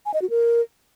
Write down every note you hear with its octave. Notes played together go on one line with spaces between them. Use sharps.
G#5
D#5
F#4
A#4